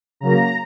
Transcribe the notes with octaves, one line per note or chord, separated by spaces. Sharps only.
C#3 F#3 A#3 A#5